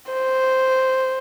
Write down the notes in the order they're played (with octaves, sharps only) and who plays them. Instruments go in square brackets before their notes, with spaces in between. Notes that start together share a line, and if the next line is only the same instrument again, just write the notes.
[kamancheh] C5